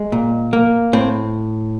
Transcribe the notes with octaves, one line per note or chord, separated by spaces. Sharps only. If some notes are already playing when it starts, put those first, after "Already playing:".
Already playing: G#3
A#2
A#3
A2 C4